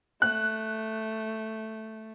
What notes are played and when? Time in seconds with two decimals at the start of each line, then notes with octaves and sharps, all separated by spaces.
0.22 A3 F#6